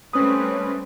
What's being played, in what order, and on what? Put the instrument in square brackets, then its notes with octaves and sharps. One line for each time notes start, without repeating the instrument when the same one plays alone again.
[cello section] G3 A3 C4 [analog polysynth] C#4 B4 [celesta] D#6